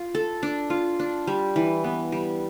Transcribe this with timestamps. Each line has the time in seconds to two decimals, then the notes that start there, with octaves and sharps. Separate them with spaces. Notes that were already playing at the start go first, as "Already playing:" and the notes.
Already playing: F4
0.15 A4
0.43 D4
0.70 F4
0.99 D4
1.27 G3
1.56 E3
1.84 B3
2.12 G3